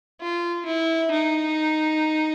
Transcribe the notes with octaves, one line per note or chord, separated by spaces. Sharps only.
F4
E4
D#4